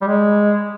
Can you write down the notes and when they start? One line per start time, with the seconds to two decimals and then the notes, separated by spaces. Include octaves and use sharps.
0.02 G3
0.07 G#3